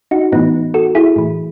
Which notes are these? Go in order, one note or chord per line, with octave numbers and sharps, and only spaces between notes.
D#4 F#4
A2 E3 B3 D#4
F#4 A4
E4 G#4
A2 E3